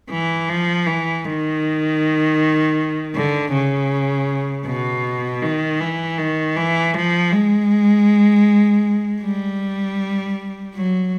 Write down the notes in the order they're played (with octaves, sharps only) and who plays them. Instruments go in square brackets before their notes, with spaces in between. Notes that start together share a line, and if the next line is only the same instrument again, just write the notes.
[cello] E3
F3
E3
D#3
D3
C#3
B2
D#3
E3
D#3
E3
F3
G#3
G3
F#3